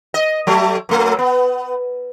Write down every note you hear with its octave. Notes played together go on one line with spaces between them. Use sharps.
D#5
F#3 A3
F#2 A3
B3